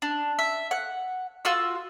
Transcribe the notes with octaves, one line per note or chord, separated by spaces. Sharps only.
D4
E5
F#5
F4 F#4 E6